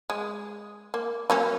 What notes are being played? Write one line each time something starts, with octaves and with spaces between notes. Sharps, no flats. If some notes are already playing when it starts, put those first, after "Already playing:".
G#3
A#3
F#3 A#3 C#4